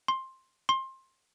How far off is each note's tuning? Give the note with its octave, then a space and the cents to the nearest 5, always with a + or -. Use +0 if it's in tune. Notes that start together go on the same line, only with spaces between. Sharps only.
C6 +15
C6 +25